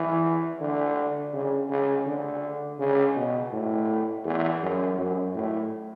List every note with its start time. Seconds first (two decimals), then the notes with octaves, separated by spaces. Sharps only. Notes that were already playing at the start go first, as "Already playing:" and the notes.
Already playing: E3
0.60 D3
1.33 C#3
1.70 C#3
2.06 D3
2.80 C#3
3.16 B2
3.52 A2
4.25 E2
4.62 F#2
4.99 F#2
5.35 A2